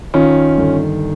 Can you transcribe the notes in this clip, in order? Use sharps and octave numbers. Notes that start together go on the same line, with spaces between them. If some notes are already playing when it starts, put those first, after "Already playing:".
D#3 C#4 F4
G1